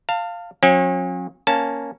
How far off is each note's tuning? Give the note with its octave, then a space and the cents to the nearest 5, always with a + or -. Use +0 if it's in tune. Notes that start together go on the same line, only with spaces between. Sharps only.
F5 +0 A5 +35
F#3 -40 C#4 -40
A#3 +0 C#4 +0 A5 +0